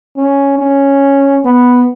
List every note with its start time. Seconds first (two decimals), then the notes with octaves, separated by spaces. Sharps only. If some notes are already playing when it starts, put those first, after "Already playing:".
0.17 C#4
0.59 C#4
1.45 B3